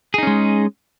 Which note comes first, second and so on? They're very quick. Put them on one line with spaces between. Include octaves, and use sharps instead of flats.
G#4 D#4 C#4 G#3